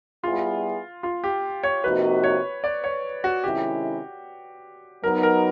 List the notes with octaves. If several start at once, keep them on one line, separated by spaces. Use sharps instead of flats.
G3 B3 E4 F4 G#4
F4
G4
C#5
C3 F3 A#3 D#4 F#4 B4
C#5
D5
C#5
F#4
C3 D#3 G#3 C#4 E4 G4
F#3 B3 D#4 A#4
A#4